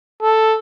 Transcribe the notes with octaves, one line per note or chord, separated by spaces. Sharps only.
A4